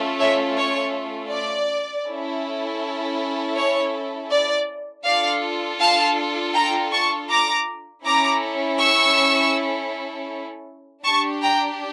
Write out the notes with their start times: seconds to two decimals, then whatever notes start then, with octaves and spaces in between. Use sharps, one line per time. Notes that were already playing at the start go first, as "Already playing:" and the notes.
Already playing: A3 C#4 F4 A4
0.19 C#5 E5
0.56 C#5
1.31 D5
2.05 C#4 E4 A4
3.56 C#5
4.30 D5
5.05 D4 F4 A4 D5 F5
5.80 F5 A5
6.54 G5 A#5
6.92 A5 C#6
7.30 A#5 D6
8.04 C#4 E4 A4 A#5 D6
8.79 C#6 E6
11.03 D4 G4 A5 C#6
11.42 G5 A#5